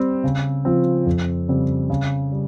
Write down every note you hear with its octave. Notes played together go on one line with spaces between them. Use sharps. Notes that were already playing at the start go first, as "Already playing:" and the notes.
Already playing: G3 C4
C#3
F3 C4
F2
C#3 G3 C4
C#3
G3